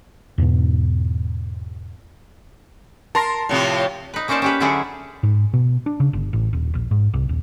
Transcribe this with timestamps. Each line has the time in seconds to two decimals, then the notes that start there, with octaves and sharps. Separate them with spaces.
0.38 E2 G#2 B2 B3
3.15 A#4 A5 C6 A#6
3.49 A2 C3 F3
4.14 D#4 B4
4.28 A#3 C#4 D#4 C5 D5 A5
4.42 C#4 G4 B4
4.60 D3 F#3 C#4 E4 G#4 D5
5.23 G#2
5.53 B2
5.86 D4
6.00 C#3
6.13 G1
6.33 A1
6.53 D#1
6.75 A#1
6.91 G#2
7.14 C2
7.29 D#1